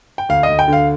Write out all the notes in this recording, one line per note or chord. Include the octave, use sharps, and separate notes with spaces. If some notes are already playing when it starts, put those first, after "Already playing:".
G5
D2 F5
D#5
D2
G5
D3 F5